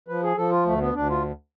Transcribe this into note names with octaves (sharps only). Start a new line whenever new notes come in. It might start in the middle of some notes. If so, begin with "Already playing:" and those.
F3 B4
G#4
F3 A4
F4
D2 A3
B3
D2 D4
F4